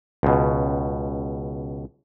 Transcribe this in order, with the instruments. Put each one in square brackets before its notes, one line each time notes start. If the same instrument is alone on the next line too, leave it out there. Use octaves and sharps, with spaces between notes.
[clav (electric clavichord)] C#2 B2